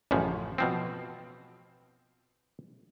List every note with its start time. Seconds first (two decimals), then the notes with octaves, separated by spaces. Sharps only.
0.11 A1 F#2 C#3 F3
0.58 B2 F3 C4